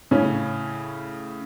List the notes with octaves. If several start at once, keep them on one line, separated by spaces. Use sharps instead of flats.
A2 C#3 C#4